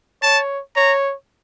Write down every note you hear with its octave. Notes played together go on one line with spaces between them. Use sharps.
C#5 A5
C#5 A#5